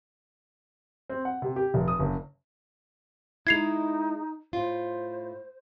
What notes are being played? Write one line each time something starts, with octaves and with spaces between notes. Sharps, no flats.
C4
F#5
C3
G4
F1
D#6
F#1
G#3 D#4 E4 G#6 C7 F7
A2 F4 C5